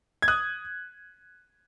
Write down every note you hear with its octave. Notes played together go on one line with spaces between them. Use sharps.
G#6
D#6 F#6